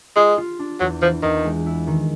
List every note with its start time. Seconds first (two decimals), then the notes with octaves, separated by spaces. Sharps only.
0.16 G#3 F4
0.38 F4
0.59 D4
0.80 E2 F#3
1.02 E3 F3
1.23 E2 D#3
1.45 G#3
1.66 E4
1.87 D#3